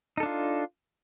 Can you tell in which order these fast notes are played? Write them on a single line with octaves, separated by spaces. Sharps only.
D#4 A4 D4 F4